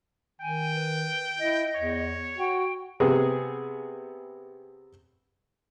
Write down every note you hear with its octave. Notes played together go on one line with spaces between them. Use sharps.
D#3 G5 G#5
B4
E4 D#5
E2 C#5
F#4 G5
C3 B3 G#4